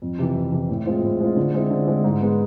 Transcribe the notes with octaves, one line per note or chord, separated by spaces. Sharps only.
F2
C3 E3
F2
C3 E3
A2
G#3 C4 F4
A2
G#3 C4 F4
D3
G#3 C4 E4
D3
G#3 C4 E4
G#2
G#3 B3